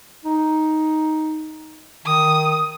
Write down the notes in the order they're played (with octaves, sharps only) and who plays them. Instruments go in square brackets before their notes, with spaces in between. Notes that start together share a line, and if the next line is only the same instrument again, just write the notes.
[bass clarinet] D#4
[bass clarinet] D#3 [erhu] D#6